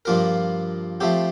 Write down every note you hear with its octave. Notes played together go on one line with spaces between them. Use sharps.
G2 F3 A#3 F4 A#4
F3 A3 C4 G4